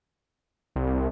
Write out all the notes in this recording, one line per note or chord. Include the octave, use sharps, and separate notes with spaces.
C2